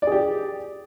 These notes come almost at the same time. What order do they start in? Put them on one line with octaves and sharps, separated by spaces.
D5 G#4 G4